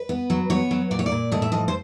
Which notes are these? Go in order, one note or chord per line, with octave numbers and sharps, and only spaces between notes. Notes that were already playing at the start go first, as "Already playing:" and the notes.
Already playing: B4
B3
F#3
B3 C#5
F#3
A#2 D5
C#5
D5
A#2
A2 D#5
E5
F3 D#5
C5